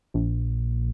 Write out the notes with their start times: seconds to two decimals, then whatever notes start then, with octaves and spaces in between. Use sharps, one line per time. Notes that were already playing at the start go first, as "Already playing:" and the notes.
0.14 A#1